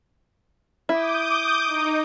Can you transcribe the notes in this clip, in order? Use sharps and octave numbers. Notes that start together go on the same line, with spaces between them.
E4 D6 D#6 G6
D#4